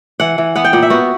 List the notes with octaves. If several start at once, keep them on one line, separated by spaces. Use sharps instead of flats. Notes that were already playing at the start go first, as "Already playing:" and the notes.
E3 F#5
E3
B3 F#5
G5
A#2 F#5
E5
B3 F#4